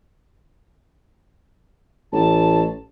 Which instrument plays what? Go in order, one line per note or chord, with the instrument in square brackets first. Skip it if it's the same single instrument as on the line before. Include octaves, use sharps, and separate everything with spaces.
[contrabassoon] A1 [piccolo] A5